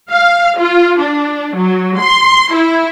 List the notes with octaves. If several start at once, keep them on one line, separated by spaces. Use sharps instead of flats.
F5
F4
D4
F#3
C6
E4